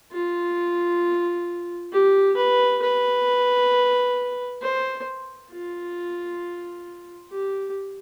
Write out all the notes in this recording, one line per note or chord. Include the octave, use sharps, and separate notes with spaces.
F4
G4
B4
B4
C5
F4
G4